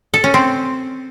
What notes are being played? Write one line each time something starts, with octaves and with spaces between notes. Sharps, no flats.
A4
C#4
C4